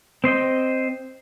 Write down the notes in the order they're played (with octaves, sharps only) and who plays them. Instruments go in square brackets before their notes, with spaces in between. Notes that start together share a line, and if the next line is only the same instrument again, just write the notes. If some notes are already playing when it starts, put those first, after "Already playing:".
[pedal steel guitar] C4 C5 D#5 G5